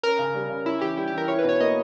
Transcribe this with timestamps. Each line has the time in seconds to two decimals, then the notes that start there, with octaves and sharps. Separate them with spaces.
0.03 C#4 A#4
0.19 C#3
0.35 G3
0.50 C#3
0.66 C#4 E4
0.81 E3 G4
0.97 G3 E4
1.08 G4
1.13 E3 A#4
1.28 E4 C#5
1.39 B4
1.44 B2 C#5
1.60 A#3 D#5